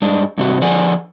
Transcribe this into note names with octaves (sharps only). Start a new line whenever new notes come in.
G2 G#3 D4
G2 C3 F#4
D3 F3 G#4 D5 F#5 G#5